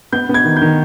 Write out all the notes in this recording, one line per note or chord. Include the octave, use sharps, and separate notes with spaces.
B3 G6
B3
G#6
D#3
D#3 G6